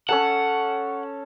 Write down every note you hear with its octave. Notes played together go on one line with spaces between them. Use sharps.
C#4 A4 F#5 A5